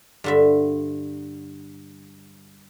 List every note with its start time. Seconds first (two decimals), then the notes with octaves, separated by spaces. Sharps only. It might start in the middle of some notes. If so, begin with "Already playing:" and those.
0.24 G2 D3 E5